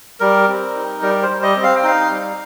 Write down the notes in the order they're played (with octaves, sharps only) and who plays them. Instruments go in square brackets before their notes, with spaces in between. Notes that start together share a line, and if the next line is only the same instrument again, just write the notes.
[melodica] G3 A#4
C4
D#4
G3 A#4
C5
G3
D#5
C4
F5
G5
D#4 F5
G3